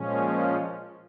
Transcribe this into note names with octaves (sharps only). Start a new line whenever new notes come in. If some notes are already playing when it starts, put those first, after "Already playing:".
Already playing: A#2 F3 G#3 C#4